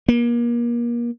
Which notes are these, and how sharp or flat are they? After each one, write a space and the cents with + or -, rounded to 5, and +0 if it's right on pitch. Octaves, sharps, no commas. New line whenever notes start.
A#3 +35